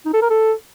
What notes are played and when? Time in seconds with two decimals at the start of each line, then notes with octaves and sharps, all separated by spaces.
0.05 D#4
0.14 A4
0.22 A#4
0.30 A4